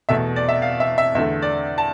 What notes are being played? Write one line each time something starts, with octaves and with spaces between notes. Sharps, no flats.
E2 B2 A3 E5
D5
E5
F5
E5
E5
E2 D3 A3 E5
D5
A5